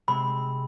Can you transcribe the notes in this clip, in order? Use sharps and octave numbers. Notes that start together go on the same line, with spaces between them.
C3 G#3 C4 B5